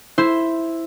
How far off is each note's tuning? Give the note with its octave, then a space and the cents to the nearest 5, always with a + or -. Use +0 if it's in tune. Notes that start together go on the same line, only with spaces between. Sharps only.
E4 +0 C5 +0